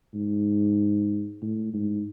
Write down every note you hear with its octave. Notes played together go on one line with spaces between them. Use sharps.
G#2
A2
G#2